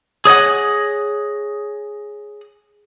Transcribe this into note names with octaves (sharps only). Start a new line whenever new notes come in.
G#4 C#5 D#5 F#5